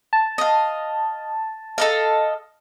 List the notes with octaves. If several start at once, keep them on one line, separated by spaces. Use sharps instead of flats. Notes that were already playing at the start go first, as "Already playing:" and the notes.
A5
D#5 F5
A4 D#5 F5